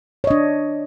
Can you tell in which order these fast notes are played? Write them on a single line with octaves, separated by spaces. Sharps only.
C#5 D#5 D4